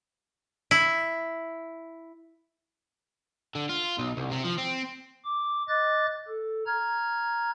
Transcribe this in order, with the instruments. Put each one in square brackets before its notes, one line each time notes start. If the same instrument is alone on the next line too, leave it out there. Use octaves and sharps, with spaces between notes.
[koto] E4
[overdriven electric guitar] D3
F4
B1
C2
C3
F3
C4
[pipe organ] D6
D#5 D6 F#6 A6
A4
A#5 F6 G#6